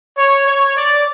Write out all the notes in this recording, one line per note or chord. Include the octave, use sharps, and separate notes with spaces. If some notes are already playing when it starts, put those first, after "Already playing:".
C#5
C#5
D5